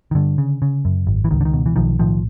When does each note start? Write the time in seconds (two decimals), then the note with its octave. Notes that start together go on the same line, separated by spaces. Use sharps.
0.11 D#3
0.15 G2 D3
0.38 C#3
0.62 C#3
0.85 F#2
1.07 G#1
1.24 E3
1.31 C#2 D#3
1.41 D3
1.45 D#3
1.53 B2
1.66 E3
1.76 B1 D#3 F3
1.99 A2 D#3 F3